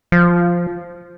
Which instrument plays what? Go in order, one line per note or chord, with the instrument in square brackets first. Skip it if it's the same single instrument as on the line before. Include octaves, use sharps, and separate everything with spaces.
[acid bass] F3